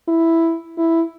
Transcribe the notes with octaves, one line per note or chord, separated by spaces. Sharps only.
E4
E4